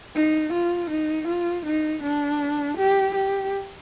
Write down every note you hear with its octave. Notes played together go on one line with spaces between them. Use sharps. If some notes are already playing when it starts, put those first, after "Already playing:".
D#4
F4
D#4
F4
D#4
D4
G4
G4